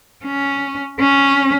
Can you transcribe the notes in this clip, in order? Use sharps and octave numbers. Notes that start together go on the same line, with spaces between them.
C#4
C#4